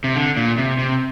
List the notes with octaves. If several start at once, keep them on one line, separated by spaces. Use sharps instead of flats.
C3
D3
A#2
C3
C3